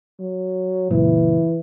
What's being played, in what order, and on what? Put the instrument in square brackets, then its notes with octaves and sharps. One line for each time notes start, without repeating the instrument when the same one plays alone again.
[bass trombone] F#3
[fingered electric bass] C#2 F#2 A#2 [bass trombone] E3